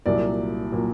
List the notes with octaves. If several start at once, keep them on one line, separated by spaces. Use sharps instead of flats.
C2 A#2 F#3 A#3 D5
A#2 F#3 A#3